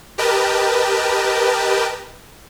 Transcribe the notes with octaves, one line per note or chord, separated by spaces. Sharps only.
G4 A#4 B4 D#5 G5 A5